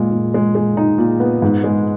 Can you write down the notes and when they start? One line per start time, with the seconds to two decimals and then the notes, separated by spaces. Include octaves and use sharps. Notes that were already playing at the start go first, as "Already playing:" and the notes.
Already playing: A#2 G#3
0.12 A#2
0.34 G#3
0.55 G#3
0.77 D#4
0.98 A#2
1.20 B3
1.42 G#2
1.64 G#3